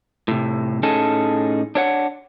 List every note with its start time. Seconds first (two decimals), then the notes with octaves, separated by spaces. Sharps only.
0.28 A2 C3
0.83 A2 C#4 D#4 G#4 A4 A5
1.75 D4 C#5 F#5